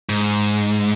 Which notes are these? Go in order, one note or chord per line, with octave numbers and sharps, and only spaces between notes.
G#2